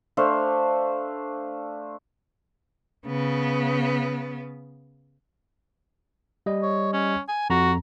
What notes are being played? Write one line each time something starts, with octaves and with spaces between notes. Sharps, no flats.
A3 D4 C5 F5
C#3 B3
G3 D#5
C#5
C#4
G#5
F2 F#4 A#5